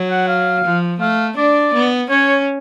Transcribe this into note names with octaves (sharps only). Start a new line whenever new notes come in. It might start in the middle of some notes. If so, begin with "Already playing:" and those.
Already playing: F#3
F#5
F5
F3
A3 F5
D4 D5
B3
C#4 C#5